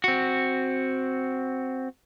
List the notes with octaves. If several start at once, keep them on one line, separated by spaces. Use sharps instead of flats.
C4 F#4